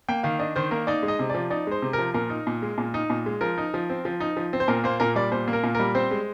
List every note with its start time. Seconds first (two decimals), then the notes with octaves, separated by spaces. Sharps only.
0.09 A#3 G5
0.23 D#3 F5
0.39 D4 D#5
0.56 D#3 C5
0.71 A#3 A#4
0.87 D#4 D5
1.03 G#3
1.08 D#5
1.19 C3
1.30 F3 D5
1.50 D#4 D5
1.67 G#3 C5
1.82 C3
1.93 F3 A#4
2.14 A#2 A#4
2.30 D#4
2.47 A#2
2.62 G#3
2.78 A#2
2.94 D#4
3.10 A#2
3.26 G#3
3.41 F3 A#4
3.58 D#4
3.74 F3
3.90 C4
4.05 F3
4.20 D#4
4.37 F3
4.53 C4
4.60 C5
4.68 A#2 A#4
4.84 A#3 C5
5.00 A#2 A#4
5.16 G3 D5
5.32 A#2 C5
5.48 A#3
5.53 A#4
5.63 A#2
5.75 G3 A#4
5.95 C4 C5
6.11 G#3